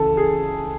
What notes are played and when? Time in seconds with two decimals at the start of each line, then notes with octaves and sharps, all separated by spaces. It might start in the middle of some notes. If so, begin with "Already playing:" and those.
Already playing: C#2 C#3 E3 A4
0.17 G#4